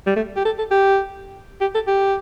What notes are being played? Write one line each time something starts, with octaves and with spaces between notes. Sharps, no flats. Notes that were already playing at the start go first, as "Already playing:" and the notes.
G3
A3
G4
A4
A4
G4
G4
A4
G4